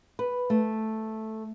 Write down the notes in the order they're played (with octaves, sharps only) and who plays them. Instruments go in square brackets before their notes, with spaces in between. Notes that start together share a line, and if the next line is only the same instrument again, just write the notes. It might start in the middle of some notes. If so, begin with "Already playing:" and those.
[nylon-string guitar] B4
A3